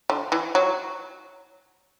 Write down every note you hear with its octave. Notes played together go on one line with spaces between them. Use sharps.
D3
E3
F#3